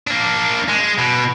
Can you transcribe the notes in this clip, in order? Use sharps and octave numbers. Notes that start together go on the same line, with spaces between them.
A#3 D4
G#3
B2